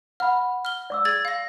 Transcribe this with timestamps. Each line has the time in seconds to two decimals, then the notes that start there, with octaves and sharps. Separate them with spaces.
0.20 F#5 B5 F6
0.65 F6 G7
0.90 D5 D6 E6
1.05 G#4 G#6 A6
1.25 F5 A#6